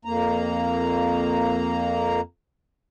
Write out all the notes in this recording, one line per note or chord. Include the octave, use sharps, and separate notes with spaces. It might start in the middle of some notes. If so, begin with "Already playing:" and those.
F2 A#3 A#5